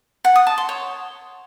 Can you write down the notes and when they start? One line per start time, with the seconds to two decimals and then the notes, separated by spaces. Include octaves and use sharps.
0.25 F#5
0.36 D#6
0.47 A5
0.58 C6
0.69 C#5